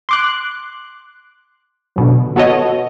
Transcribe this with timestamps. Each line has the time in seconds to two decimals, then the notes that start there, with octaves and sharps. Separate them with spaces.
0.09 C6 D6 F#6
1.96 F#2 B2 D3
2.36 B3 F#4 A4 C#5 D#5